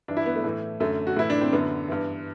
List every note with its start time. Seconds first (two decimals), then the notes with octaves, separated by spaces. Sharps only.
0.08 G2 E3 D4
0.17 E4
0.26 B3
0.36 A3
0.44 A2 E3
0.80 F#2 D3 A3
1.07 F#4
1.17 A2 E3 E4
1.30 D4
1.41 C4
1.53 F#2 D3 B3
1.88 G2 E3